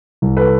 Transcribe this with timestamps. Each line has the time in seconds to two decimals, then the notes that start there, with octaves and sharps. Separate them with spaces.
0.22 C2
0.37 A4 B4